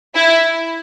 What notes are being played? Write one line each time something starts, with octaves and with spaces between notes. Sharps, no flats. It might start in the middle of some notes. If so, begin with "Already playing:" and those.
E4